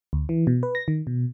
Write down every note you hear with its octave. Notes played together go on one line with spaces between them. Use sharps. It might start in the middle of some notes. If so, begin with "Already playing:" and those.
D2
E3
B2
B4
A#6
D#3
B2